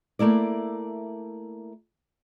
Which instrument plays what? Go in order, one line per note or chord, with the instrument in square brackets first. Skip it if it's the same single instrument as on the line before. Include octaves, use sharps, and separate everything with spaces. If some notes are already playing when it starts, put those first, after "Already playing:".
[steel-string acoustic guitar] A3 A#3 E4 D5